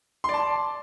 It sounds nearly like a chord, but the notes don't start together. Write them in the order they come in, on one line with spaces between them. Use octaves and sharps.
C6 D5 A5